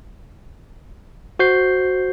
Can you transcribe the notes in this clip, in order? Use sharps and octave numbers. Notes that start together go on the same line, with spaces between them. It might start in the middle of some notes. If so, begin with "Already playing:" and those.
F#4 C5 G6 C7